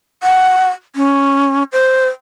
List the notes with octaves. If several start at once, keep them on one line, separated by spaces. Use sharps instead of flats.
F#5
C#4
C5